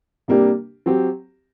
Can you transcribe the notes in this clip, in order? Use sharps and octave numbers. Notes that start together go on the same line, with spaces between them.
C3 G3 A#3 D4 G4
F#3 C4 G4